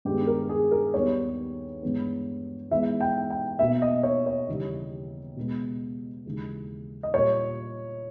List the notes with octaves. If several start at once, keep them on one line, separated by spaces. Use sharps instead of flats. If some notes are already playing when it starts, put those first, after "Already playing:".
G2 D#3 G#3 B3 G4
A#4
G#4
A#4
D#2 D#3 G3 B3 C#5
G2 E3 G#3 B3
G#2 E3 G#3 B3 E5
G5
G5
B2 A#3 E5
D#5
C#5
C#5
D#2 C#3 E3 G3
B2 G#3 B3
D#2 C#3 E3 G#3
D#5
A#2 G3 A#3 C#5